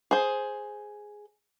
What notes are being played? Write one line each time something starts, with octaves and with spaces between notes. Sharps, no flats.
G#4 C5